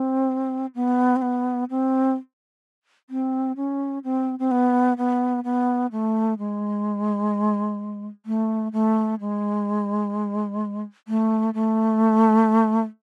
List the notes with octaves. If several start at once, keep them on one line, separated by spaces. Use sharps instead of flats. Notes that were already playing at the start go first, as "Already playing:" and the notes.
Already playing: C4
B3
C4
B3
C4
C4
C#4
C4
C4
B3
B3
B3
A3
G#3
A3
A3
G#3
A3
A3